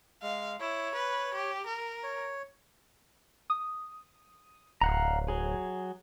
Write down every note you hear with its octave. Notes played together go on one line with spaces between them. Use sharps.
G#3 F5
E4 C#5
B4
G4
A#4
C#5
D#6
D1 F5 F#5 A#5
F#3 G#4